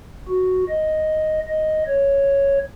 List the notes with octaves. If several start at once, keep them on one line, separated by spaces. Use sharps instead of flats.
F#4
D#5
D#5
C#5